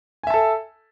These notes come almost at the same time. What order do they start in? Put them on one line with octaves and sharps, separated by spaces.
G#5 E5 A5 A4